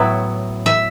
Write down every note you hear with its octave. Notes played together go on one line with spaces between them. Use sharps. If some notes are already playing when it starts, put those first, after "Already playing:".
Already playing: A2 F#3 B3 E4
E5